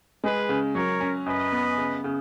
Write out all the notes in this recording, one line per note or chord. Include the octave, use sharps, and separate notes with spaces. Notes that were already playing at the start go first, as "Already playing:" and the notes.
G#3 G#4 B4
C#3
F#3 A#4 C#5
C#4
F#2 B4 D#5
B3
C#3
C#3